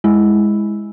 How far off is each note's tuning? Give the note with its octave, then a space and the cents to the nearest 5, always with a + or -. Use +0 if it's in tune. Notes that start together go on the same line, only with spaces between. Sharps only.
G#3 +0 E4 -5